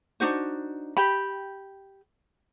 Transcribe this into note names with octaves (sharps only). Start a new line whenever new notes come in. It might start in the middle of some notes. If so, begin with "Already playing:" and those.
D4 D#4 F#4 C5
G4 G5 B5